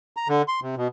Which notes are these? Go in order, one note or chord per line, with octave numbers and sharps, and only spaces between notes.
A#5
D3
C6
C3
B2